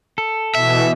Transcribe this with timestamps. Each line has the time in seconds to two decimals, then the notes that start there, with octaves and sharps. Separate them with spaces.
0.18 A4
0.55 B2 E3 E5